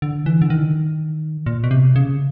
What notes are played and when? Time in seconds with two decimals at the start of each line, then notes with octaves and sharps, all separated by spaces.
0.02 D3
0.26 E3
0.42 D3
0.50 D#3
1.46 A#2
1.64 B2
1.71 C3
1.96 C#3